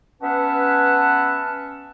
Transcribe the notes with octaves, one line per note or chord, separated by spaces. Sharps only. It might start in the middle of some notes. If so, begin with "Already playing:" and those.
B3 C#4 B4 E5 F#5 A5